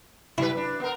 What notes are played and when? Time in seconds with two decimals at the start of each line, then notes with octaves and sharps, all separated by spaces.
0.38 F#3 E4 B4
0.57 D4
0.80 B3 A#4